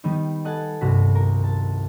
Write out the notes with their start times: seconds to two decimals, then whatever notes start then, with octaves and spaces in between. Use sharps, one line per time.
0.04 D#3 G3 B3 D#4
0.45 A4 D#5 F#5 G#5 A5
0.81 C2 G2 F#4 B6
1.15 A#4
1.44 A5